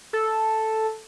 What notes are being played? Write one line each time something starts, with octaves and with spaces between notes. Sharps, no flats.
A4